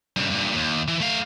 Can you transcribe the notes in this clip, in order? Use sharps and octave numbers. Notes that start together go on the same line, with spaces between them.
G2 C#3
G2 A#2
D#2
E3
A3 F5